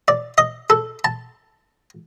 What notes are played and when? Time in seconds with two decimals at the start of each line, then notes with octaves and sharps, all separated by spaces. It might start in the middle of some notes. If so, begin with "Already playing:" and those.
0.08 D5
0.38 D#5
0.70 A4
1.04 A5